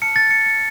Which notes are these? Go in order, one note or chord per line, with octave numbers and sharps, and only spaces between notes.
A5 F6 C#7
A6
C#7
C#7